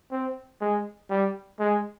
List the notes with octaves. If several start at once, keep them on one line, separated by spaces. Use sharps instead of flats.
C4
G#3
G3
G#3